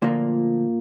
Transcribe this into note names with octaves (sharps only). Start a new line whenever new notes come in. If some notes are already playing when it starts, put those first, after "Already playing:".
D2 A#2 D3 F3 A#3